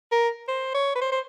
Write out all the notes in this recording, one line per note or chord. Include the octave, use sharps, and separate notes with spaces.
A#4
C5
C#5
B4
C5
C5